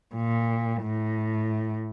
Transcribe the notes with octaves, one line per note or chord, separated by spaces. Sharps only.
A#2
A2